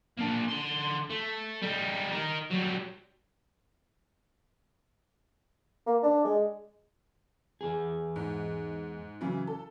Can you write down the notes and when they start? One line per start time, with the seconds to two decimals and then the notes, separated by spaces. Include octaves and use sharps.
0.19 A#3 D4
0.48 D3 C6
1.10 A3
1.62 G3 D#4
2.12 D#4 A#4
2.50 F#3 G3
5.87 A#3
6.03 D4
6.25 G#3
7.61 E2 G#4
8.16 G#2
9.21 C#3 E3 F#3
9.47 A4